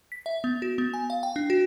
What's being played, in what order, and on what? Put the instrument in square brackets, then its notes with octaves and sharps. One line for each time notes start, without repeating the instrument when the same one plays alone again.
[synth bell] B6
E5
B3
F#4
B3
G#5
F5
G5
D4
F#4